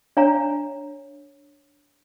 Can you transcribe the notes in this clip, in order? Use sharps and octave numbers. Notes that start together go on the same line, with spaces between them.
D4 C#5 D5 F5 G#5 A#5